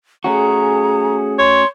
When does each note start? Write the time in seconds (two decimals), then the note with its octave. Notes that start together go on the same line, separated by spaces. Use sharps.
0.24 A3 C#4 F#4 G#4 A#5
1.39 C#5 C6